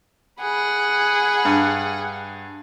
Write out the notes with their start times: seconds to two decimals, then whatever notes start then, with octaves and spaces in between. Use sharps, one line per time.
0.42 G#4 F#5 B5
1.45 G2